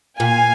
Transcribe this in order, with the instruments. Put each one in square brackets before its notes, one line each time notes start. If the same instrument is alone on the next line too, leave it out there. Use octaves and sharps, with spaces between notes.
[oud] A#2 [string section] F5 G#5